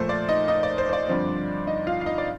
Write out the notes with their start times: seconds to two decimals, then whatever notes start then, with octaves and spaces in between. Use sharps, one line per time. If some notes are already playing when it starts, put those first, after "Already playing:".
Already playing: A#2 F3 A3 C5
0.09 D5
0.29 D#4 D#5
0.48 D#4 D#5
0.63 D5
0.78 C5
0.89 C5
0.93 D5
1.08 G2 D3 F3 C4
1.67 D#4 D#5
1.87 F4 F5
2.01 F5
2.06 D#4 D#5
2.18 D5